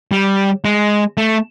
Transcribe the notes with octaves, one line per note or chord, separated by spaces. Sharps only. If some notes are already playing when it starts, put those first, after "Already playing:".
G3
G#3
A3